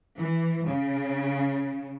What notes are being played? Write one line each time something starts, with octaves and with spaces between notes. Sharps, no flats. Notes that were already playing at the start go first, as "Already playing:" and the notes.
E3
C#3